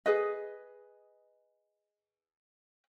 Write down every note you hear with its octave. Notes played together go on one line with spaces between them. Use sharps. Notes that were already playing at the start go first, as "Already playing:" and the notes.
G#4 B4 D#5